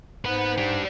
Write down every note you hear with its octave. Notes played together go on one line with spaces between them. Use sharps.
G#2 B4 F#5
D4 G4